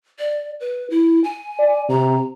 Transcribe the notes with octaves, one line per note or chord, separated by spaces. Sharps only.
D5
B4
E4
G#5
D5
C3 A#5